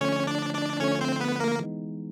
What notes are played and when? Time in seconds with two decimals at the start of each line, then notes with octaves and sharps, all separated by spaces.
0.01 D3 F3 A3 C#4 C#5
0.27 D4 D5
0.54 D4 D5
0.80 D3 F3 A3 C#4 C#5
1.01 C4 C5
1.20 B3 B4
1.40 A#3 A#4
1.60 E3 G#3 B3 D#4